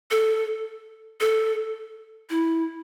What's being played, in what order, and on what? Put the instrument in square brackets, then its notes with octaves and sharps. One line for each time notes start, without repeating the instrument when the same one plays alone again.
[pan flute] A4
A4
E4